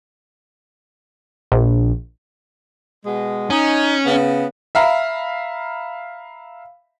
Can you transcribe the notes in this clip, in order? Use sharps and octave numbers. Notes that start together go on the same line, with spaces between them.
A#1
B2 G#3
C#4 D#4
C#3 B3
E5 F5 A#5 B5